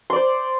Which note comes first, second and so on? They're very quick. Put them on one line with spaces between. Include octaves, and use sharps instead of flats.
C6 D5 C5